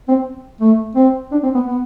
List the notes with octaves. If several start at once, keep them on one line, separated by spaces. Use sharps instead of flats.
C4
A3
C4
D4
C4
B3
B3